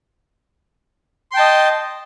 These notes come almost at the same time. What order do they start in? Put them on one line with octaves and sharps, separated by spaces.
C6 G5 A5 D#5